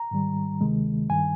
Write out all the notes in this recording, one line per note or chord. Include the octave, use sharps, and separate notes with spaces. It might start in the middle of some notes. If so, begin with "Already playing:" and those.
Already playing: A#5
G#2 D#3 G3
D2 C3 D#3 G#3
G2 D#3 G3 G#5